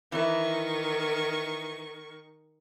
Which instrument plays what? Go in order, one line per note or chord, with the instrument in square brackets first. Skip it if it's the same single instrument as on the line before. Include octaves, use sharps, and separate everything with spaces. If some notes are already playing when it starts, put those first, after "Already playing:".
[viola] D#3 C#6 [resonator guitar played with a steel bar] E3 E4